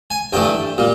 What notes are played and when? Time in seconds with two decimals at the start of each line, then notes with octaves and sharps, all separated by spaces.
0.11 G#5
0.33 G2 E3 A3 G5
0.78 A#2 G3